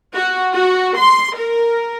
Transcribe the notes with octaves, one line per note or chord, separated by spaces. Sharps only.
F#4
F#4
C6
A#4